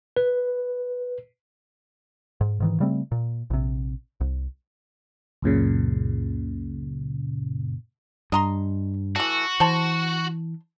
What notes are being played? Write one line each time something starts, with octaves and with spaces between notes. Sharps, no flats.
B4
G#2
G#2 D#3 E3
C#3 G3 A3 C4
A#2
A#1 C3
C2
C#2 F#2 A#2 C#3
G2 D#5 A#5 C6
E3 A3 F#4
E3 C5 A5